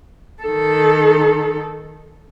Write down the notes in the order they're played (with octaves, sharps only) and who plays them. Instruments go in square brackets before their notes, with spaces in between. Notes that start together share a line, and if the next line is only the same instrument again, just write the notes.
[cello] D#3 A4